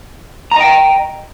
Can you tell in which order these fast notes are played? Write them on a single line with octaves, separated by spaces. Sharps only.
A#5 D#5 G5